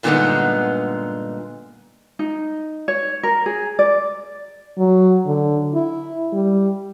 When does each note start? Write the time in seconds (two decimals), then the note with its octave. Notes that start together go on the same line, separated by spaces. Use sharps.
0.03 G2 A#2 D3 G#3 B3 D#4
2.19 D#4
2.88 C#5
3.23 A#4
3.46 G#4
3.79 D5
4.78 F#3
5.26 D3
5.74 E4
6.33 G3